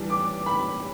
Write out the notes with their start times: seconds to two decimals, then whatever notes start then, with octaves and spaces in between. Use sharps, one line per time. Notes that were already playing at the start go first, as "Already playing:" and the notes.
Already playing: E3 G3 D4
0.10 D6
0.46 B5